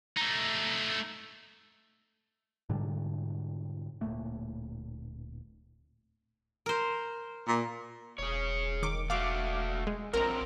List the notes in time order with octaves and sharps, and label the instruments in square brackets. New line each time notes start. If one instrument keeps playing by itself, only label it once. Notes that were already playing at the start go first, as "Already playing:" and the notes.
[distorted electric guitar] A3 D#4
[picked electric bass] G#2 B2 D3 G3
D1 A#2 A3 A#3
[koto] A#4 C5
[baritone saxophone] A#2
[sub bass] E1 [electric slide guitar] G#4 C#5
[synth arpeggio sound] D#3 D6
[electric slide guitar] A3 F#4 [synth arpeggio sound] F5 D6
[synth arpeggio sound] G#3
[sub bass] A#1 [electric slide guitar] F#3 C4 F4 [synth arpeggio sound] A#4 A#5